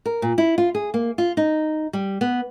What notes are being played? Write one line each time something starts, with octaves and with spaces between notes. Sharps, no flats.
A#4
A#2
E4
F4
G#4
A#3
F4
D#4
G3
B3